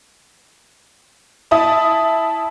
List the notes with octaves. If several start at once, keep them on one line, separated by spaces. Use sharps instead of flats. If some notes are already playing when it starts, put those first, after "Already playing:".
E4 E5 A5 D#6